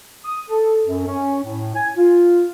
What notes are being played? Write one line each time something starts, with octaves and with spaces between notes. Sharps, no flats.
D#6
A4
F#2
C#4
A2
G#5
F4